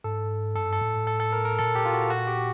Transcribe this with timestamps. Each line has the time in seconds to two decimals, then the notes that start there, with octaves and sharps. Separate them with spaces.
0.04 G#2 A4
0.55 G2 A4
0.73 A4
0.81 A2
1.07 A4
1.20 A4
1.33 A#4
1.45 A#4
1.59 A#2 A4
1.75 G4
1.85 F4
1.93 F#4
2.10 F#4
2.27 G4